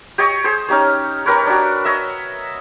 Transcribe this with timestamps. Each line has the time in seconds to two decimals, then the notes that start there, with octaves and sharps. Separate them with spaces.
0.18 G4 C#5 D#5 C#6
0.44 G#4 C5
0.68 C#4 D#4 G4 C#5
1.26 G4 A#4 B4 C#5
1.47 D4 F#4
1.85 C#5 D#5 E5